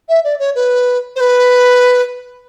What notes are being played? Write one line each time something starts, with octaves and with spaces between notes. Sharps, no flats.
E5
D5
C#5
B4
C5
B4